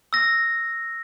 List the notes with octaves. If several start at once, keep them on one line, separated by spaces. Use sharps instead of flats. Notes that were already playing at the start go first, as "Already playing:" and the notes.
E6 A#6